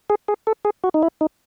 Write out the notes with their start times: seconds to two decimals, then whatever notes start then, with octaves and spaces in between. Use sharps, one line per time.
0.10 G#4
0.28 G#4
0.47 A4
0.65 G#4
0.84 F#4
0.94 D#4
1.03 E4
1.21 D#4